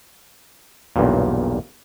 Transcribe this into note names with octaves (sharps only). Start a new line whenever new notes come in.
B1 E2 G2 A#2